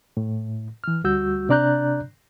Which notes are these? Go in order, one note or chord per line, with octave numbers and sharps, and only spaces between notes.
A2
E3 F6
D2 G3 F#4 E6 G6
C3 D4 D5 A#5 F#6 G6